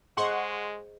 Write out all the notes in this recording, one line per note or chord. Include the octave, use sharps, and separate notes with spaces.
G#3 G#4 C5 D#5 F#5 C6 C#6